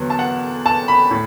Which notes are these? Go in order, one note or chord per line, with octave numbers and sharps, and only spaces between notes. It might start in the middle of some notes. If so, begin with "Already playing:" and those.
Already playing: E2 D3 F#3
A5
F#5
A5
B5
A2